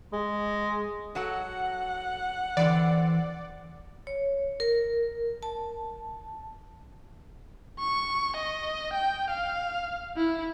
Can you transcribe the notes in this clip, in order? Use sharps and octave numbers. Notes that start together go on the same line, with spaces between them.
G#3
F#3 F#4 A4 F#5
E2 D3 E3 C4 D5
C#5
A#4
A5
C#6
D#5
G5
F5
E4